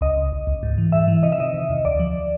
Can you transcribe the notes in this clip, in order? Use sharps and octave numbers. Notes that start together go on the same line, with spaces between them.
C#2 D#5
C#2
C#2
C#2
G#2
E3
G#2 E5
E3
C3 D#5
E5
D#3 D#5
C3
E2
D2 D5
F3